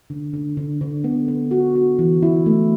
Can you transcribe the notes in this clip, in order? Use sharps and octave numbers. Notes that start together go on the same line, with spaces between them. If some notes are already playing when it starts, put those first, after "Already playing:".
D3
D3
D3
D3
B3
B3
F#4
F#4
E3
E4
A3